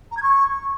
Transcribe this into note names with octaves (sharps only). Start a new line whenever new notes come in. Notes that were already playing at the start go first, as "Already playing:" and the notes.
A#5
G#6
C#6